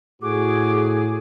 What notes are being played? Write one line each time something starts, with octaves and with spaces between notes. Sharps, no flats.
A2 F#4 G#4 D6